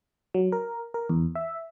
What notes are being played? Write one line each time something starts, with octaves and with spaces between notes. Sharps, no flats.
F#3
A#4
A#4
E2
E5